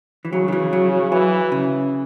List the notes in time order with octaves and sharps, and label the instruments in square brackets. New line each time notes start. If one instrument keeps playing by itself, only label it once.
[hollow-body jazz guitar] E3
[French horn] C#3 [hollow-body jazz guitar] F#3
[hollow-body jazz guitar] D#3
E3
F#3
[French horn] E3 [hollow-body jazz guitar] F#3
[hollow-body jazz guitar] C#3